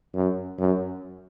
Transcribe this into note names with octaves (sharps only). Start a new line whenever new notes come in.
F#2
F#2